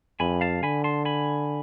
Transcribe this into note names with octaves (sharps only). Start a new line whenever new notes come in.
F2 G#5 B5
F5 A5
D3 G#5 B5
A5 C6
G#5 B5